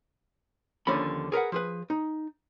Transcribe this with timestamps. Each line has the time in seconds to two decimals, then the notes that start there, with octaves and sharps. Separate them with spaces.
0.87 D#2 D3 F3 C#4 B5
1.32 G#4 A#4 B4 F#5
1.52 F3 G#4 B4
1.90 D#4